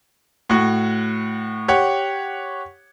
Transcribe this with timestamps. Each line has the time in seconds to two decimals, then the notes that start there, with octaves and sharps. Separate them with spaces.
0.50 A2 F#4
1.68 G4 C#5 F#5